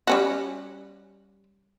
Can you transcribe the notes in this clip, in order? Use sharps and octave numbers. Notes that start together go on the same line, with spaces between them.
G3 C#4 F#4